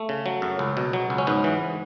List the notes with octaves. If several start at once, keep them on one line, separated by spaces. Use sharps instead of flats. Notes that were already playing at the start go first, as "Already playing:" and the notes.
Already playing: A3
C#3
F#3
F#2
C#2
B2
F#3
C#2
C#4
G#2 B3
E3